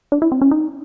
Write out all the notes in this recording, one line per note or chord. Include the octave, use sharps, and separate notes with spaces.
D4
E4
C4
C#4
D#4